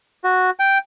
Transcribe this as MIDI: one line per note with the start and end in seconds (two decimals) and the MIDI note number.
0.24 0.50 66
0.59 0.78 79